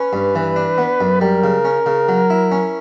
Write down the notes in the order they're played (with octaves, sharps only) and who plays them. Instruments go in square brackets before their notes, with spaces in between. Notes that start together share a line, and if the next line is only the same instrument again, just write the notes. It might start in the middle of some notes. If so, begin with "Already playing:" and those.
Already playing: [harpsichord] C#4 [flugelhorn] B4
[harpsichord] G2
E3
D4
B3
F#2
[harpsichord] G3 [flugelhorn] A#4
[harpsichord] C#3
C#4
C#3
F#3
E4
C#4